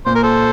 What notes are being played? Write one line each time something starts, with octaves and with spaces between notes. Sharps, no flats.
A#2 C5
A#4
A4 C5